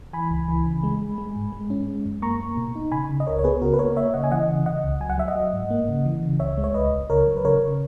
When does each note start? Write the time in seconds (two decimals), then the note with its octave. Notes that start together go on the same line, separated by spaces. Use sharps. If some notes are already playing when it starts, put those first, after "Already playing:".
0.13 E3 G#5 B5
0.31 C#2
0.48 E3
0.66 C#3
0.83 G#3
1.01 G#3
1.18 G#3
1.36 G#2
1.52 G#3
1.70 C#4
1.87 G#3
2.06 F#2
2.22 A#3 A#5 C#6
2.40 A#3
2.57 B2
2.75 D#4
2.92 C#3 G#5 B5
3.09 C#3
3.20 D#5
3.27 C#2 A#4 C#5
3.39 C#5
3.44 B3 G#4 B4
3.62 C#3 F#4 A#4
3.74 B4
3.79 A#3 A#4 C#5
3.96 A#3 C#5 E5
4.14 C#3 D#5 F#5
4.24 G#5
4.31 E3 D#5 F#5
4.49 C#3
4.66 C#3 D#5 F#5
4.84 C#2
5.00 F#3 G#5
5.10 F#5
5.18 F#3 E5
5.28 D#5 F#5
5.35 F#3
5.53 G#2
5.70 A#3
5.89 C#3
6.05 E3
6.23 C#3
6.40 C#2 C#5 E5
6.58 G#3
6.64 C#5
6.74 C#2 B4 D#5
6.92 C#2
7.10 C#3 A#4 C#5
7.27 F#3
7.36 B4
7.45 C#3 A#4 C#5
7.61 C#3